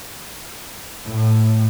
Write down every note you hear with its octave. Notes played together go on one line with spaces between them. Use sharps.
A2